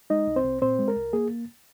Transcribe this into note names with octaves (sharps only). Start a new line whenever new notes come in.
G#3 D#4 D#5
C2
C4 C5
C2
A#2 C4 C5
G#3
A#4
C2
A#3 G#4